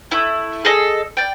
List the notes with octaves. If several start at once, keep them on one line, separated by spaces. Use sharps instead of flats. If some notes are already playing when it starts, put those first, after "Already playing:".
A3 E4
G#4 A4 D#5
D5 G5